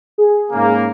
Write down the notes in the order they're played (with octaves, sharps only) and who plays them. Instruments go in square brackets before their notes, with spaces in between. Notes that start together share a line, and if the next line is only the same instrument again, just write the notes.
[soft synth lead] G#4
[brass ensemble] G#2 C#3 A#3